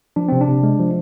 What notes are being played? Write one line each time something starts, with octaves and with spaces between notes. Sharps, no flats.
F3 D4
C3 C4
D4
C3
G#3
F3